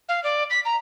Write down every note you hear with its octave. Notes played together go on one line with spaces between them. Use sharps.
F5
D5
B6
A#5